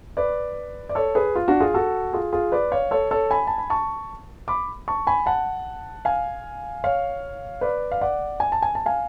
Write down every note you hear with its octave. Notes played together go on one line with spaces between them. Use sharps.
B4 D5
D5
A4 C#5
G#4 B4
F4
D4 F#4
F4 G#4
F#4 A4
F4 G#4
F4 G#4
B4 D5
C#5 F5
A4 C#5
A4 C#5
G#5 B5
A5
B5
A5 C#6
B5 D6
A5 C#6
G#5 B5
F#5 A5
F5 G#5
C#5 F5
B4 D5
F5
D5 F#5
G#5
A5
G#5
A5
F5 G#5